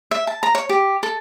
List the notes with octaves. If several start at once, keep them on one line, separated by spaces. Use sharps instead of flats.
E5
A5
A#5
C#5
G4
A4